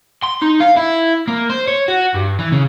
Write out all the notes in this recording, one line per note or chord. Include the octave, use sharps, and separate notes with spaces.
C6
D#4
F5
E4
A#3
C5
C#5
F#4
G2
E3
C#3